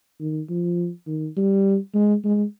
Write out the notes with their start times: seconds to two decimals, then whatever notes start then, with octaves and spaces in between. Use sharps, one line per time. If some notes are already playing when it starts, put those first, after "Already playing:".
0.20 D#3
0.49 F3
1.07 D#3
1.37 G3
1.94 G#3
2.24 G#3